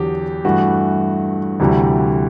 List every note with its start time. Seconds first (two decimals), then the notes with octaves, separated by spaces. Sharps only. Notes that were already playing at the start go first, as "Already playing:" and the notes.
Already playing: E2 D3 F#3 G4
0.45 G2 E3 A3 F#4
1.60 D2 C3 E3 G3